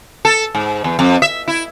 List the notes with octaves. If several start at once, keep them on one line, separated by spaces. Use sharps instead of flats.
A4
G#2
E2
F2
E5
E4